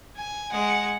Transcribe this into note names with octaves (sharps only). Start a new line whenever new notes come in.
G#5
G#3 F#5